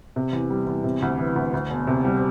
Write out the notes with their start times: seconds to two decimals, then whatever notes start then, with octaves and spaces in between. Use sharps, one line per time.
0.16 C3
0.33 E2
0.50 G3
0.67 E2
0.84 C3
1.02 D2
1.18 E3
1.36 D2
1.54 D2
1.70 E1
1.87 C3
2.05 G3